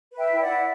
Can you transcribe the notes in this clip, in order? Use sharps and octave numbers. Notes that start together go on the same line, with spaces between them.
B4
E5 G5
E4
D5 F#5
E4